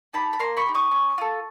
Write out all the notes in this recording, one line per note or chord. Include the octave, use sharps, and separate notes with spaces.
D#4 G4 A5 B5
B5
A#3 A#5 C6
B5 C#6
D#4 G4
C#6 D#6
C#4
F4 A4